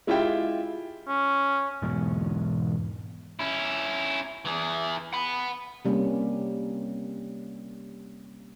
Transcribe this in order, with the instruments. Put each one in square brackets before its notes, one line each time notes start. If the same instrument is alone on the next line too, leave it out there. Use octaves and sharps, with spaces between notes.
[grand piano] G#3 E4 F4 G4 E5 G5
[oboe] C#4
[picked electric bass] E2 G#2 B2
[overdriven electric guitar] C#4 E4
E3 G#4
F#5 B5
[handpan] C3 G3 A#3 C#4